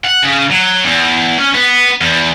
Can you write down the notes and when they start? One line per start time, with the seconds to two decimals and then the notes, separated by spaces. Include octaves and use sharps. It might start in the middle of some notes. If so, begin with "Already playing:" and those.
0.05 F#5
0.23 C#3
0.50 F#3
0.84 E2
1.38 C#4
1.54 B3
2.01 E2